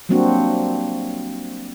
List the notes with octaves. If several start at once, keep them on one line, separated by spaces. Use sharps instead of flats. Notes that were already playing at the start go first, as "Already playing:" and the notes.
F#3 G3 A#3 C4 D4 F#4